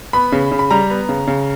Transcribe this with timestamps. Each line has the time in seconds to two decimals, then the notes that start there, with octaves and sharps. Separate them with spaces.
0.13 B3 B5
0.32 C#3
0.52 C#3
0.59 B5
0.71 G3 A#5
0.90 B3
1.09 C#3
1.28 C#3